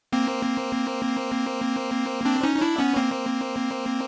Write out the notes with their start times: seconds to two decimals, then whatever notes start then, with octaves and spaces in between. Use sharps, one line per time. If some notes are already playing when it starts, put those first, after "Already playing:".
0.12 A#3 C4
2.26 C4 D4
2.43 C#4 D#4
2.56 D#4
2.61 D4 E4
2.78 B3 C#4
2.96 A#3 C4